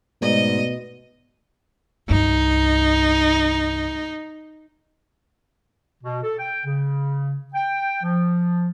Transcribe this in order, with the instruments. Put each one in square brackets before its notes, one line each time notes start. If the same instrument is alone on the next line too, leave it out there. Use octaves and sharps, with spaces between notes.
[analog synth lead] G#2 [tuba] B2 [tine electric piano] A3 B3 D5 [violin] D#5
[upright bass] C2 G2 [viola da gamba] D#4
[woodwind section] B2
A4
G5
C#3
G5
F3